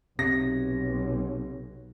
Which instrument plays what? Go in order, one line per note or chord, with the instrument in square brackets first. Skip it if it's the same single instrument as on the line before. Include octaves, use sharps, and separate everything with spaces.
[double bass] B1 [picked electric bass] C3 [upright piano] A#6